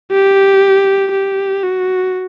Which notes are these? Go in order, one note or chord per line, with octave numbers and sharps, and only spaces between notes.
G4
G4
F#4